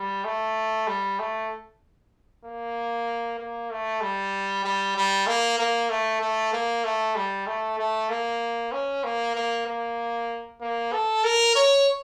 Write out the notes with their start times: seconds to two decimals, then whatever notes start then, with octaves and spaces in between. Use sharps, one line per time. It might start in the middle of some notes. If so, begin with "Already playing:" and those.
Already playing: G3
0.24 A3
0.87 G3
1.19 A3
2.45 A#3
3.39 A#3
3.71 A3
4.01 G3
4.64 G3
4.96 G3
5.27 A#3
5.59 A#3
5.90 A3
6.21 A3
6.53 A#3
6.84 A3
7.15 G3
7.47 A3
7.79 A3
8.09 A#3
8.72 C#4
9.03 A#3
9.35 A#3
9.66 A#3
10.61 A#3
10.92 A4
11.24 A#4
11.55 C#5